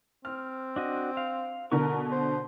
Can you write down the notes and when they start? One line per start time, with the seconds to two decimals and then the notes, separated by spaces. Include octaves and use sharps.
0.25 C4 F6
0.76 D4 F#4 D#5
1.17 F5
1.72 B2 D3 A#4 C#6
2.12 C5